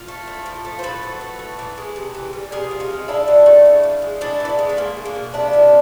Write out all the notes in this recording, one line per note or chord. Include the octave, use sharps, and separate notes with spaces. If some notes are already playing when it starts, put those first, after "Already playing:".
Already playing: F4
A3
A2
F3
A3
C5
A2 A4 B4
F#3
A3
A2
E3
G#3
C3
E3
G3
C3 G#4 A#4
F3
D#4 F4
G#3
A2 D4 E4
F#3
A3
C#3
F3
G#3
A2 D4 E4
E3 B3
A#3
G#3
A3
G#3 A#3
G#3
A#3
B2
C3 D4 E4
F3